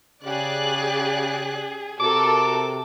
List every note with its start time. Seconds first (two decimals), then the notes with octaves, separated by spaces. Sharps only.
0.24 C#3 G4 G#4 D5 F#6
2.00 C3 F#4 A4 A#4 A5 D6